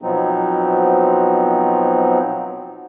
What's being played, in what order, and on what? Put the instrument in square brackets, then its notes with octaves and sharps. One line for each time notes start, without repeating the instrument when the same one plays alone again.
[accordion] B2 F3 F#3 B3 C4 D#4